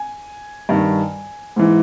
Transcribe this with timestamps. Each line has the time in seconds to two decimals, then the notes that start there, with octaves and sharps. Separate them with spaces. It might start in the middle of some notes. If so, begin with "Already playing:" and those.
Already playing: G#5
0.69 G2 D#3
1.56 G#2 E3